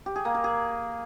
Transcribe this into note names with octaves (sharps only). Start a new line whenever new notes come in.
G4
G#4
A#3
A#4
G#4